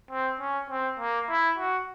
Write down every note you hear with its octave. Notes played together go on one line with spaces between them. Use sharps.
C4
C#4
C4
A#3
E4
F#4